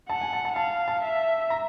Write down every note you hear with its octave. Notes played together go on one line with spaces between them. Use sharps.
F#5 A5
G#5
A5
A5
F5 A5
A5
E5
A#5